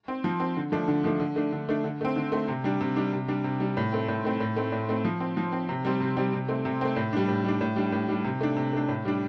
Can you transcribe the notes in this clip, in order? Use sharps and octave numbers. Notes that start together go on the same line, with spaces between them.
C4
F3
C4
D3
F3 A3 D4
D3
F3 A3 D4
D3
A3 D4
D3
A3 D4
D3
A3 C4
D3
A3 C4
C3
G3 D4
C3
G3 D4
C3
G3 D4
C3
G3 D4
A2
A3 C4
A2
A3 C4
A2
A3 C4
A2
A3 C4
F3
C4
F3
C4
C3
G3 C4
C3
G3 C4
C3
A3 C4
C3
A3 C4
A2
G3 D4
A2
G3 D4
A2
G3 D4
A2
G3 D4
C3
A3 D4
C3
A3 D4
A2
G3 D4